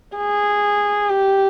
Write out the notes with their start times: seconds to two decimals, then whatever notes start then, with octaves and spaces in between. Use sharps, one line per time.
0.17 G#4
1.10 G4